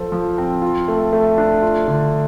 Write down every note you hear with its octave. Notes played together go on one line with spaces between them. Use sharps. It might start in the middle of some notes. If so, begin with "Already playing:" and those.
Already playing: F3 A4 C5
F3
C4
F4
A3
A3
D4
F4
D3